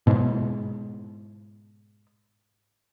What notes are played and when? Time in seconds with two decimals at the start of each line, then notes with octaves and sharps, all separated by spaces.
0.07 G#2 B2